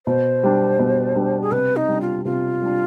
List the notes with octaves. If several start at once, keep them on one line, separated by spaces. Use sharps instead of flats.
B2 C5
G3 D4
B2
G3 D4
G#4
C3 B4
D#4
G3 D4
F4
C3 F4
G3 D4